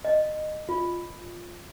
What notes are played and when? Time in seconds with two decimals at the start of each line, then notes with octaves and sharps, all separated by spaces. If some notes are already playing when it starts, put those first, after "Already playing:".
0.05 D#5
0.69 F4